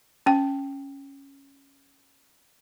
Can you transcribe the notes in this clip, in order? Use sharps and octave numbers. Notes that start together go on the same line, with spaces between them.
C#4 G5